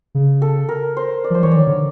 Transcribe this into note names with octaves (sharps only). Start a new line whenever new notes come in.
C#3
A4
A#4
C5
D5
F3 C5
E3 C#5
D#3 D5
D3